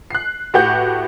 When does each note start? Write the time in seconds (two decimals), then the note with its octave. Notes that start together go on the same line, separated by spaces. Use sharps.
0.11 F#6 C7
0.54 A2 F#4 G4 B4 F#5 G6